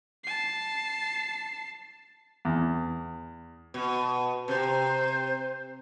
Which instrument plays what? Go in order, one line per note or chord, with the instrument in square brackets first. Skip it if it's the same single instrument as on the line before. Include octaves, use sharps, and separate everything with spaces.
[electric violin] A5 C7
[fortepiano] E2
[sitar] B2
[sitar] C3 [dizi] C5